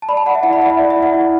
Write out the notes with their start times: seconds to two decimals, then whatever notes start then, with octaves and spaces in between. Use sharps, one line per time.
0.02 A5
0.09 D5 B5
0.17 A5
0.26 D5 F#5
0.35 E5
0.43 E4 F#5
0.53 B5
0.62 D5 F#5
0.70 E5
0.79 D5
0.90 E5
0.96 E4
1.03 F#5
1.14 E4